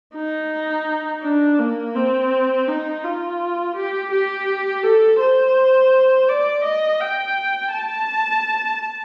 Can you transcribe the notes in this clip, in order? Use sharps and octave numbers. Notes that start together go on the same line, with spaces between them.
D#4
D4
A#3
C4
D#4
F4
G4
G4
A4
C5
D5
D#5
G5
A5